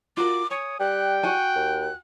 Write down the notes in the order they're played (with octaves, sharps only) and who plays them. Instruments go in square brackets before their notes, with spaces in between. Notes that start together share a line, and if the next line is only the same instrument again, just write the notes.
[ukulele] F4 F#4 A#4 [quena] D6
[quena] C#5 [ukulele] G#5 [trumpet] D#6
[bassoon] G3 [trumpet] G5 [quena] F#6
[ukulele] F#4 F#5 G#5 [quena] F#6
[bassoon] D#2